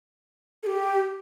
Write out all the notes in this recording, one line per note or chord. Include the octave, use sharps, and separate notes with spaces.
A4
G4